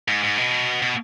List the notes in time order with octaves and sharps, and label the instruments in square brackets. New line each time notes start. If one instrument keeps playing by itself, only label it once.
[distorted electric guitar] G#2
G#2
B2
B2